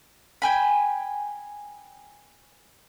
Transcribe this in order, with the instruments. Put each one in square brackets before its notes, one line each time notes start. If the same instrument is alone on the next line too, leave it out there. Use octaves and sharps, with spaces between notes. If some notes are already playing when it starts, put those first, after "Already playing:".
[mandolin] G5 G#5 B5